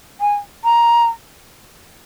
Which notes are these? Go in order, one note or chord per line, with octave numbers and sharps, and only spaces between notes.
G#5
A#5